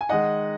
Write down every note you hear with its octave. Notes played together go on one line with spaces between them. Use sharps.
G#5
D#3 G#3 D#4 D#5 F#5